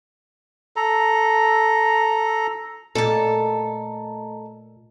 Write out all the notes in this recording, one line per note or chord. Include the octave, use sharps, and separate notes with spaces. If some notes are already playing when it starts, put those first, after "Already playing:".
A4 A#5
A#2 A3 A4 D#5 A5 A#5